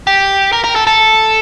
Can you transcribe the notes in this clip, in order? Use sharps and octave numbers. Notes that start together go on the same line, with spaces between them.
G4
A#4
A#4
A4
A4